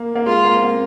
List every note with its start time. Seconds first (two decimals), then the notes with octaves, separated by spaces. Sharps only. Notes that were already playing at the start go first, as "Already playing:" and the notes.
Already playing: A#3
0.15 A#3
0.26 G#3 F4
0.45 A#3
0.55 C4
0.64 A#3